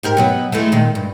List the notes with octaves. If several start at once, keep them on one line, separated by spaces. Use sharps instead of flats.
G#2 G4 A#4
B2 F#3 B3
E3 G#3 A3
A#2 D#3 G#3
G2